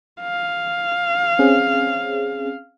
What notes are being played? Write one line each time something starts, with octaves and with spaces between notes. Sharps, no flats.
F5
C4 C#4 G#4